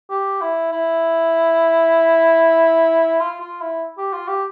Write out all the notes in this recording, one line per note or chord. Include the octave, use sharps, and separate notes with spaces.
G4
E4
E4
F4
F4
E4
G4
F4
G4